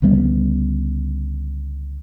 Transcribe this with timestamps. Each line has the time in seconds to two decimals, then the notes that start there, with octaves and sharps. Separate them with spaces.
0.02 C#2 D3 G3 B3